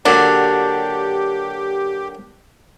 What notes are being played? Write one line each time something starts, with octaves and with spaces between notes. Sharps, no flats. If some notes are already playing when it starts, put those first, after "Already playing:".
A#2 D3 F#3 D4 G4